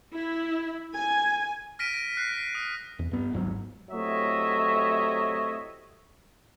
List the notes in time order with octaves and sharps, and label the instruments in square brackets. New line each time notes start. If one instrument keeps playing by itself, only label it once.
[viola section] E4
G#5
[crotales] F6 A#6 B6 D7 D#7
A#6 D7 D#7
F#6 C7
B6
D#6 D7
[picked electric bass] E2
G2 B3
D#1 G#1 G#2 F#3
[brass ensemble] A2 C3 F#3 C#5 D#5 E5